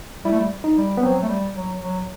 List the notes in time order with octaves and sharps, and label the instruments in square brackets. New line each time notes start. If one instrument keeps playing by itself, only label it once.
[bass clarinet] G3 [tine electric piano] E4
[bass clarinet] A3
G3
[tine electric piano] D#4
[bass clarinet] G3
[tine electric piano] B3
[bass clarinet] F#3 [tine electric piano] C4
[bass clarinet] A3
G3
F#3
F#3